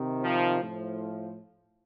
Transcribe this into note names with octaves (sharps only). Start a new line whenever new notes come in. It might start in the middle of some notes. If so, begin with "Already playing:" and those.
Already playing: C3 D#3
F3
A2 F3